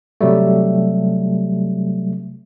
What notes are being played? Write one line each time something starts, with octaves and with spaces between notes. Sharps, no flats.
C3 F#3 G3 A3